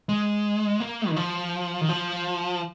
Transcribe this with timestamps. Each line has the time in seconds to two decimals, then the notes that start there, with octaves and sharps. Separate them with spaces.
0.09 G#3
0.80 A#3
1.09 D#3
1.16 F3
1.81 D#3
1.89 F3